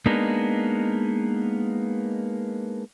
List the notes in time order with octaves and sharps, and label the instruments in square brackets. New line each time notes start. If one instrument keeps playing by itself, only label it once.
[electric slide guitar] G#3 A#3 B3 D4 D#4